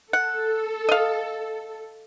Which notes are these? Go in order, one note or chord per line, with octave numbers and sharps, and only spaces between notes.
A4 F#5
D#5 F5